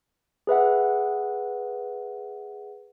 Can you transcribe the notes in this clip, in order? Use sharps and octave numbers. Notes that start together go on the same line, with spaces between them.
G#4 B4 E5 F#5